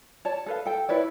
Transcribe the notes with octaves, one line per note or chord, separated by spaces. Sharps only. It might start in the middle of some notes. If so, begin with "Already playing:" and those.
C#5 D5 A5
A4 B4 F5
A4 G5
E4 B4 C#5 D5